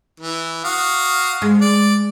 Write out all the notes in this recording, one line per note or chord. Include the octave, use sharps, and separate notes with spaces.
E3
F#4 F5 D#6
G#3
D5